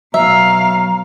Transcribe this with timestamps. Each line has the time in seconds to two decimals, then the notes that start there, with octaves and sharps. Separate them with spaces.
0.14 B2 F#3 E5 F5 A#5